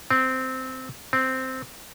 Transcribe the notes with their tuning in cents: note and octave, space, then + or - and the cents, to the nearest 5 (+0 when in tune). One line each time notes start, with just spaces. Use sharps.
C4 -10
C4 -5